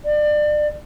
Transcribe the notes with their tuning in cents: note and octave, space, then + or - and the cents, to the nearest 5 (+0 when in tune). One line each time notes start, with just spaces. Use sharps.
D5 +30